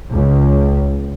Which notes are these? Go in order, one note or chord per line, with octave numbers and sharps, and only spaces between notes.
C#2